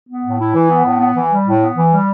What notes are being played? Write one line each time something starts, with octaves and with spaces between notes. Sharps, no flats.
B3
A2
E4
E3
B3
A2
B3
E3
G3
A2
B3
E3
G3